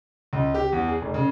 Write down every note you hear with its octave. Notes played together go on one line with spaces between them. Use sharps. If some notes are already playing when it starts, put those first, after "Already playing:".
C#2
G4
E2
G#4
F1
C#3